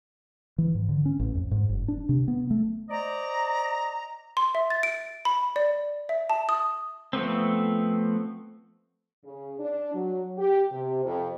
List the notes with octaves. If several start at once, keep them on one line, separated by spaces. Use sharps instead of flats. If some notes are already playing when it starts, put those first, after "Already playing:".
E3
G#2
D3
C#4
A1
F2
G#2
F#1
D4
C3
B3
A3
C5 D5 D#5 A#5
C6
E5
A6
D7
B5
D5
E5
A5
D#6
F3 A3 B3 C4
C#3
D4
F#3
G4
C3
F2